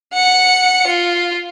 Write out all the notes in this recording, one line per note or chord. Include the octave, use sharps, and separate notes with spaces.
F#5 C#7
F4